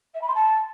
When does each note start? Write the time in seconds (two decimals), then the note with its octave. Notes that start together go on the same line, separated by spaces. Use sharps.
0.14 E5
0.21 B5
0.28 C6
0.35 A5